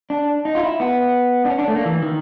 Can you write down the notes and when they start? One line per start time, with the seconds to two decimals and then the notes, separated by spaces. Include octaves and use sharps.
0.10 D4
0.45 D#4
0.55 F4
0.63 E4
0.80 B3
1.45 D4
1.50 C#4
1.59 D4
1.68 A3
1.76 A#3
1.85 E3
2.03 D#3